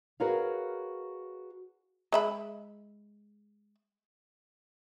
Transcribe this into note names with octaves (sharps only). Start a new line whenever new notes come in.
F#4 G#4 A#4 B4 C#5 F5
G#3 E5 B5